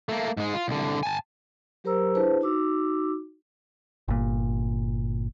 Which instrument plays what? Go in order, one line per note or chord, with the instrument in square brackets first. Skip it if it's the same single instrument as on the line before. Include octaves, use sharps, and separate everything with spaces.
[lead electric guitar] A3 A#3
G#2 G#3
F4
C2 D3
G#5 A5
[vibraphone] F#3 G4 A#4 C5 A#5 E6
D4 E4 G#4 B4 C5 A5
D#4 F#4 D6 E6
[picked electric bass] G1 A#2